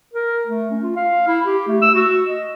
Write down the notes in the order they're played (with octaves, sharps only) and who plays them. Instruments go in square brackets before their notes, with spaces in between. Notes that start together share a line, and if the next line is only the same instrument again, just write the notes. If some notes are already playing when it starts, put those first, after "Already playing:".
[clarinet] A#4
A3
C#4
F4
F5
E4
G4
A3
E6
F#4
D#5